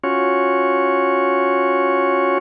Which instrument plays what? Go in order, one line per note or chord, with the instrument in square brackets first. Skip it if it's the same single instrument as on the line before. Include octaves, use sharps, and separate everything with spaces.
[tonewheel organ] C#4 F4 F#4 C#5